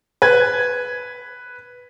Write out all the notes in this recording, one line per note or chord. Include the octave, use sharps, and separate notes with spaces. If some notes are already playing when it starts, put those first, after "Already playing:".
B4 G#6